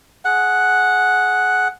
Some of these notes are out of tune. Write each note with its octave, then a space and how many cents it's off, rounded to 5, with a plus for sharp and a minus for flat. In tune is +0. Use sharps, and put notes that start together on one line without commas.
G#4 +15 F#5 +0